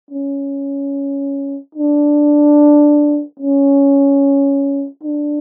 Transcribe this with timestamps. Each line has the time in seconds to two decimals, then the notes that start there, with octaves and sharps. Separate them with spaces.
0.11 C#4
1.75 D4
3.40 C#4
5.04 D4